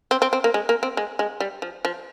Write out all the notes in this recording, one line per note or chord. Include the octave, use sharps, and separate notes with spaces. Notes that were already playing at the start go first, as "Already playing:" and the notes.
C4
C4
C4
A#3
G#3
A#3
C4
G#3
G#3
G3
F3
F3